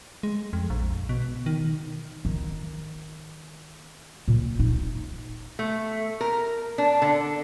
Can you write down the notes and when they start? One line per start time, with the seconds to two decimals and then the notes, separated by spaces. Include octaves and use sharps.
0.23 G#3
0.53 F2
0.70 A#1
1.09 B2
1.46 D#3
2.25 D#3
4.28 A#2
4.59 D#4
5.59 A3
6.21 A#4
6.78 D4
7.02 D3